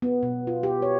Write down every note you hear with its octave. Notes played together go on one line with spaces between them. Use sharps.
B3
B2
F4
G4
C#5